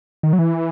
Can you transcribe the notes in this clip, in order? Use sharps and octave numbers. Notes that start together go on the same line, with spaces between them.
D#3
F#3
E3